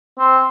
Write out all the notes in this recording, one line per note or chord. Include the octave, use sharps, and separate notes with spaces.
C4